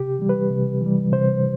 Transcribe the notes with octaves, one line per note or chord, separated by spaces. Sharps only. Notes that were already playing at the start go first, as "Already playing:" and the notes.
Already playing: C3 G4
E3 G3
B4
C3
E3 G3
C3 C5